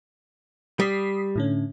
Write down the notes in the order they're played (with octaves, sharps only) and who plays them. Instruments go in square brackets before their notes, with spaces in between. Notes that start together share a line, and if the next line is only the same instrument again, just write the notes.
[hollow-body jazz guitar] G3 [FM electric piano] D#6 B6 C7
[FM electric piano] A2 D3 C#4